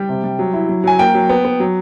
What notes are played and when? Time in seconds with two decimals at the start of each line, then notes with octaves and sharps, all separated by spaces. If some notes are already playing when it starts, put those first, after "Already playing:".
Already playing: G3 G5
0.09 C3
0.24 G3
0.39 F#3
0.53 E4
0.69 F#3
0.84 F#3 G#5
0.99 A#3 G5
1.14 F#3
1.29 B3
1.45 B3
1.60 F#3